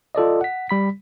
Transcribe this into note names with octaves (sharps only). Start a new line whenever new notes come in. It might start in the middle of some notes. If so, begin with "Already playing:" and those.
F4 A4 D5 D#5
F#5 B6
G3 B5 B6